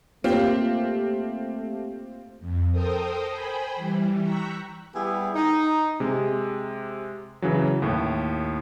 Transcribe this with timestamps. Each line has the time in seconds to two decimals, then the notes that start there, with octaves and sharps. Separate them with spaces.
0.24 A3 A#3 C4 F4 G4
2.40 F2
2.72 A4 A#4 C5 G5 D#6
3.28 C5 G5 G#5 B5
3.76 E3 G3
4.21 G5 A#5 C#6 E6 F#6 B6
4.94 G3 B3 E4 G4 G#4
5.34 D#4
6.00 C3 G#3
7.42 C#3 E3 F#3
7.82 D#2 A2